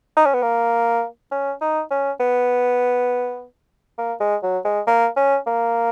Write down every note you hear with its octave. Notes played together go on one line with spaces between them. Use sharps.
D#4
C#4
B3
A#3
C#4
D#4
C#4
B3
A#3
G#3
F#3
G#3
A#3
C#4
A#3